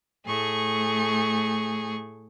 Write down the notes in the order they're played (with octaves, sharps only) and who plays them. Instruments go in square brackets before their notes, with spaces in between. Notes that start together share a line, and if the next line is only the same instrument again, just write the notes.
[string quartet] A2 A3 G#4 C#6